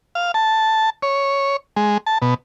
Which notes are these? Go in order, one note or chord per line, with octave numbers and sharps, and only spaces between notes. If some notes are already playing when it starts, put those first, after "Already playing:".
F5
A5
C#5
G#3
A5
B2